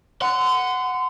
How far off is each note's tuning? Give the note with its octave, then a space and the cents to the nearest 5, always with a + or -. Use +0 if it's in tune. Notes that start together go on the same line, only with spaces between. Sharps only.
F#5 +0 C6 -30